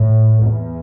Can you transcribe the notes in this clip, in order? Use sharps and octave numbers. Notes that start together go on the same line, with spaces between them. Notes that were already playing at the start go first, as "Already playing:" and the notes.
Already playing: A2
E2